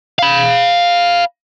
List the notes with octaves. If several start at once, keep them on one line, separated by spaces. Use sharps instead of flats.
F5 B5